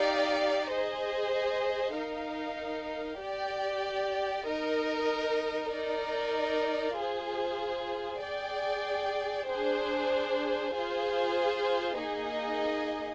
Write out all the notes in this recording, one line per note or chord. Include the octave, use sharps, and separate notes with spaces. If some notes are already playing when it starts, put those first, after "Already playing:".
Already playing: D#4 G4 D5 F5
G#4 C5 D#5
D#4 A#4 F5
G4 D5 G5
D#4 A#4 D#5
D#4 A#4 D5
F4 G#4 C5
G#4 D5 G5
D4 G#4 C5
F4 G#4 C5
A#3 D#4 G#4 D#5